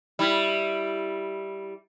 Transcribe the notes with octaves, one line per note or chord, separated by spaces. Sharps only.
G3 E4